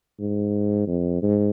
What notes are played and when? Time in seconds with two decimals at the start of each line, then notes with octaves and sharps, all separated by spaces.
0.20 G#2
0.87 F2
1.22 G#2